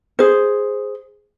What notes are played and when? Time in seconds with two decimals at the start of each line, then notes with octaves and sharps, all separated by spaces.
0.19 G#4 C5